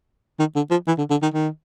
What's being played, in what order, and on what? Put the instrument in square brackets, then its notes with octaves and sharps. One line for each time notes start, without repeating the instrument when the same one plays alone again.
[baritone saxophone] D#3
D3
F3
E3
D3
D3
D#3
D#3